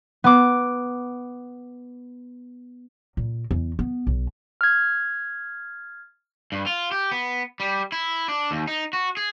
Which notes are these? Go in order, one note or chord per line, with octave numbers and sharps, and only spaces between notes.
B3 D6
A#2
E2
B3
B1
F6 G#6
G2
F4
G4
B3
G3
E4
D4
D#2
D#4
F#4
G#4